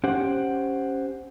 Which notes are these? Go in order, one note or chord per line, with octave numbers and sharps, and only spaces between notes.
C#4 G4 C5 F#5